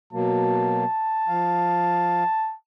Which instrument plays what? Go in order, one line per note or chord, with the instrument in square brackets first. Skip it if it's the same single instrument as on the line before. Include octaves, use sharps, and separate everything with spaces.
[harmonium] B2 F#3 A#3 [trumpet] A5
[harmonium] F3 F5